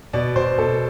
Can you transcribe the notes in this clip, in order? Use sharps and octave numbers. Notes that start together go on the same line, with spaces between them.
B2 D5
B2 C5
B2 A4